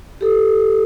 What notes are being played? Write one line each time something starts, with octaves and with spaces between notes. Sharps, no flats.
G4 A4